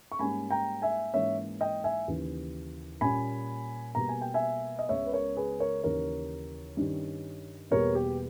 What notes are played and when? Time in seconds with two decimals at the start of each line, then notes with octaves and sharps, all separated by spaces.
0.12 C#6
0.19 G#2 G3 A#3 C#4 G#5 B5
0.51 G5 A#5
0.82 E5 G#5
1.14 G#2 E3 A#3 C#4 C#5 E5
1.61 D#5 G5
1.84 E5 G#5
2.08 D#2 C#3 E3
3.01 A#2 G3 A#3 C#4 G#5 B5
3.95 B2 G3 A#3 A#5
4.09 G#5
4.21 G5
4.34 E5 G#5
4.79 D#5
4.89 C#2 C#3 G#3 B3 C#5 E5
5.07 B4
5.13 A#4 C#5
5.36 G#4 B4
5.60 A#4 C#5
5.83 D#2 C#3 E3 A#4 C#5
6.77 G2 D#3 G3 C#4
7.70 E2 B2 G3 A#3 A#4 C#5
7.95 G4